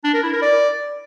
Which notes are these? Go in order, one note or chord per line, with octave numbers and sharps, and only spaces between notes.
D4
A#4
E4
A#4
D5